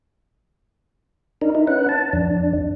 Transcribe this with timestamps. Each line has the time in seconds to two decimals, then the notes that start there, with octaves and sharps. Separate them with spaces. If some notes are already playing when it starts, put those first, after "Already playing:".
1.41 D4 D#4 A#4
1.55 D#4 E4
1.67 C#4 B4 F#5
1.89 A5
2.13 F2 D4